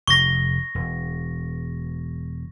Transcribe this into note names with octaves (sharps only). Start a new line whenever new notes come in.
F1 C#6 A#6
E1